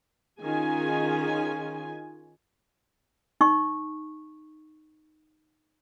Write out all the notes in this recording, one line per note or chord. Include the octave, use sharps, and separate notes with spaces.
D#3 C#4 F4 G#4 G#5
D#4 C#6